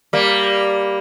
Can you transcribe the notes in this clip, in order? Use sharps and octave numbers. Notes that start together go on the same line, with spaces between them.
G3 A#3